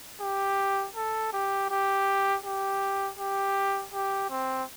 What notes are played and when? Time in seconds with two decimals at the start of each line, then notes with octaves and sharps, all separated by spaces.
0.21 G4
0.95 A4
1.33 G4
1.70 G4
2.44 G4
3.18 G4
3.93 G4
4.30 C4